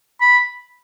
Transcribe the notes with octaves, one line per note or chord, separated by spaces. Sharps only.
B5